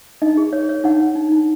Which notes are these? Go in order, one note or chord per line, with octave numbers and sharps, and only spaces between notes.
D#4 D#5
G#4
C#5
C#5
D#4 C#5 F#5
C#5
D#4
D#4